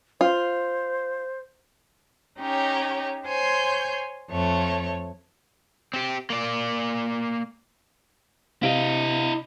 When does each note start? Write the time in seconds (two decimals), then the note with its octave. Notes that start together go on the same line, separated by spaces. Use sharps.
0.21 F4 C5
2.38 C#4 D#4 G4 C#5
3.26 C5 C#5 G#5 C6 G6
4.30 F2 A3 C#5
5.94 C4 G4
6.30 A#3 D5
8.63 C3 E4 D#5 F5 D7